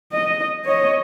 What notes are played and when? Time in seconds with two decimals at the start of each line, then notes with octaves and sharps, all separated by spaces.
0.13 D#5
0.65 C#5 D#5